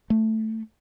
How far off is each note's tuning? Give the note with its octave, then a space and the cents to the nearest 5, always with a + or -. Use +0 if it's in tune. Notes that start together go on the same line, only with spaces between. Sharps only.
A3 +5